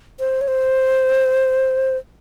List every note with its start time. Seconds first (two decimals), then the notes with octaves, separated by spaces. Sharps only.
0.20 C5
0.41 C#5
0.48 C5